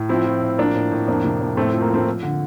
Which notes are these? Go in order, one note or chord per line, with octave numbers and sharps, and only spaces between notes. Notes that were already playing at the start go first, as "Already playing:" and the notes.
Already playing: A2
F3 C4 E4
F3
A2
F3 A#3 D4
A2
A2
F2 A#3 D4
C3
F2
A2 A3 C4
F3 A3
A#3
F3 A3 C4
F3
D3